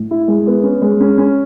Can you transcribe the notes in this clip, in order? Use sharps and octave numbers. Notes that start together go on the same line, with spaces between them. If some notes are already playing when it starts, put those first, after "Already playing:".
Already playing: A2
E4
G#3
B3
C#4
G#3
C#4
C#4